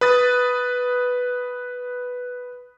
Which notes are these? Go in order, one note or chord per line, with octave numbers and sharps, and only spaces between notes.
B4 D#6 A6